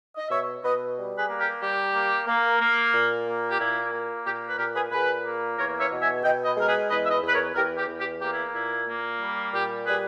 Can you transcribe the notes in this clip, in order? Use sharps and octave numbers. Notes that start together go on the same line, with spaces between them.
D#5
B2 C#5 E5
B2 B4 D#5
G3
G#4 B4
A#3
G4 A#4
G3 G4
A#3
A#3
A#3
A#2
A#3
G4
A#2 E4
A#3
A#2 G4
B4
A#2 G4 A#4
G#4 B4
A#2 G#4 B4
A#3
E2 A#4 C#5
C#5 E5
B2
E5 G#5
B2 D#5 G5
B4 D#5
G#3
A#4
G#4 B4
E2 B4 D#5
E5
B4 D#5
E2
B4
A#4 C#5
E2 G4 A#4
G4
E2
G4
A#3 G4
E4
A#2 E4
A#3
G3
A#2 G4
G3 G#4 B4